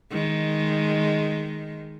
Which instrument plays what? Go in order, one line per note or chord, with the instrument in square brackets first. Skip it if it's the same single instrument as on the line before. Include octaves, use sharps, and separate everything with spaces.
[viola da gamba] D#3 G#3